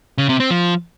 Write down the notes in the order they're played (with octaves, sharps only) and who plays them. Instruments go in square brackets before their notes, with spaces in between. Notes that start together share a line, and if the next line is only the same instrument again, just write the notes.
[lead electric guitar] C#3
C3
C4
F3